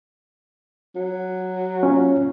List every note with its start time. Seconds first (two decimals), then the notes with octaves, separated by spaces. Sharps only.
0.96 F#3
1.83 C#4 F4 C#5